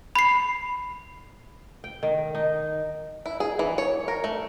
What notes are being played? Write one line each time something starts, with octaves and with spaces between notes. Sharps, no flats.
B5 C7
G5
D#3
D#4
E4
G#4
E3
C#5
A#4
A3